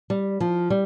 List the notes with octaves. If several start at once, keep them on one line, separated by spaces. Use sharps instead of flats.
G3
F3
G3